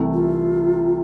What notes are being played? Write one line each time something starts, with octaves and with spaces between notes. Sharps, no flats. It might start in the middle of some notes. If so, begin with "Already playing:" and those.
Already playing: C2 C3 E3 A3
F4